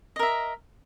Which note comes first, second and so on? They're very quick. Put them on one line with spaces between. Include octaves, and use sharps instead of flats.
D#5 A#4 E5